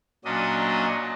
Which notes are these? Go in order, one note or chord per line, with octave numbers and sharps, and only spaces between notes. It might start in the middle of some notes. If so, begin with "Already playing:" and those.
A#2 F#3 C#4 D4 D#5